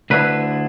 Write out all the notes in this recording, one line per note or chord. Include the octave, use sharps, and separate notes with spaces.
D2 D3 A3 E4 B4